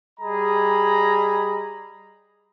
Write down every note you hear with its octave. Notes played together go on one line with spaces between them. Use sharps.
G3 G#4 D#5 A#5 B5